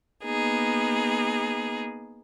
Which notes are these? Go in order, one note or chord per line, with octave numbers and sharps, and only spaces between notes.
A#3 B3 D#4 G#4